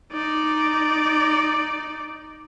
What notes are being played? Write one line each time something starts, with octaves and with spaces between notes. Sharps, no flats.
D#4 D5